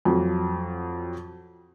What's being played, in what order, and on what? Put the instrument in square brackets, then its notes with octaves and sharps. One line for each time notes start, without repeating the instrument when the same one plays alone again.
[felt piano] F2 F#3